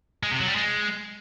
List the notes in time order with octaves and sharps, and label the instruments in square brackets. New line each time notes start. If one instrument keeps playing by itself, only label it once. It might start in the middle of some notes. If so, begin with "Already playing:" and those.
[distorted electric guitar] G#3
C3
F#3
G3
G#3